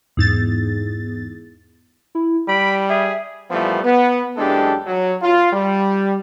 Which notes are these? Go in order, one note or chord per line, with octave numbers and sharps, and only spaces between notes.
E2 G#2 A6
E4
G3 B5 D7
G#4 E5
A#2 E3 F3 G3 A3 B3
B3
F#2 E3 G#3 D4 G4 A4
F#3
F4
G3